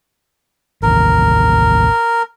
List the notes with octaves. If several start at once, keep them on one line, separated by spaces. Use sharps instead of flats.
A1 D#2 A#4